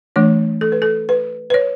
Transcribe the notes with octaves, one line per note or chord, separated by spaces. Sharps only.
E3 A3 D4 C#5
A4
B4
A4
B4
B4
C#5